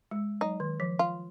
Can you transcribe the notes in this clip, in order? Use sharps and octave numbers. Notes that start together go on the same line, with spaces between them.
G#3
F#3 D#4
D#3
F3
F4